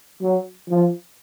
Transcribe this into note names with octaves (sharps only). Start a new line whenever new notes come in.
F#3
F3